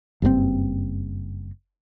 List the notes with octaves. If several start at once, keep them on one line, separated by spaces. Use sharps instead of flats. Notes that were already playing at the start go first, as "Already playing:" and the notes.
F#1 G2 A#2 C4